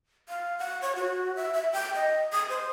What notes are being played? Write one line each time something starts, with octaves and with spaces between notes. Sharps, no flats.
F5
F#5
C#5
F#4
E5
E5
G5
D#5
D#6
C5